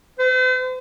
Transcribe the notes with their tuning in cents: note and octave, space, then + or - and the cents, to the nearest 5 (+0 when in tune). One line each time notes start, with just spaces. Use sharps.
C5 -45